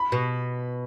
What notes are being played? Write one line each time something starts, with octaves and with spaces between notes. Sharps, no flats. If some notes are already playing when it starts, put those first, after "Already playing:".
Already playing: B5
B2